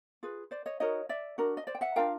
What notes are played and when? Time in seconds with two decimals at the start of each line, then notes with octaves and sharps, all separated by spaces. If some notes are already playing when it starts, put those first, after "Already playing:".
0.23 F4 G#4 B4
0.51 C5 D5
0.66 C#5 D#5
0.80 D#4 F#4 A#4 C#5 D#5
1.09 D5 E5
1.38 D4 F#4 A#4
1.57 D#5
1.67 C5 D5
1.75 G5
1.81 E5 F#5
1.96 D4 F4 A#4 F5 G5